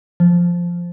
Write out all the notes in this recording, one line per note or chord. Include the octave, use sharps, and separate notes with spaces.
F3